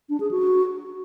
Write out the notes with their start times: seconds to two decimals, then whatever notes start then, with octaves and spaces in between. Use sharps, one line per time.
0.09 D4
0.20 G#4
0.31 F#4